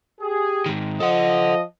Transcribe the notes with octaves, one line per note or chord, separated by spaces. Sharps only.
G4 G#4
G#2 D#3
F3 A4 D#5 F#5